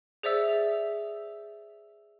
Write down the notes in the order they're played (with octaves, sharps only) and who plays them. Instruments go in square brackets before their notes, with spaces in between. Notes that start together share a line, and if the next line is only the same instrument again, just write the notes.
[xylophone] G#4 C5 D5 E5 E6